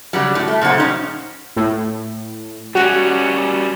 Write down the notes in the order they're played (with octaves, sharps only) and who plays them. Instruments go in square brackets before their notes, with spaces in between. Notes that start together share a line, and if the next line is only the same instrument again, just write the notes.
[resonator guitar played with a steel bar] C#3 F#3 G3
A2
A3
A#2 C#3 F#3 C5 F#5
G2 C#4 D#4
[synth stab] A2
[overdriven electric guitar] G3 C#4 [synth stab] F#4